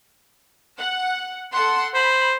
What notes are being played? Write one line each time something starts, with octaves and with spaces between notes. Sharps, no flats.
F#5
A4 F#5 C6
C5 B5